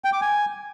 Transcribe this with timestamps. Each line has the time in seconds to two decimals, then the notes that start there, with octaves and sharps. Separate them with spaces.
0.04 G5
0.13 D6
0.21 G#5